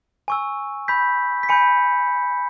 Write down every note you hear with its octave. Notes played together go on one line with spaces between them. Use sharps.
G#5 C#6 E6
B5 G6 B6
B6
G#5 B5 G6 C#7